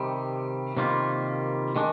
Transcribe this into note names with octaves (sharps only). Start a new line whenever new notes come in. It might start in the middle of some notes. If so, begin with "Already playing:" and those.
Already playing: C3 D#3 G3
C3 D#3 G3 A#3 F4
D#3 G#3 D4